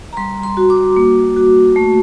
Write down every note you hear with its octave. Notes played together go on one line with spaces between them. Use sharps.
A#5
G3 C6
C6
F#4
D6
A#3
F#4
A3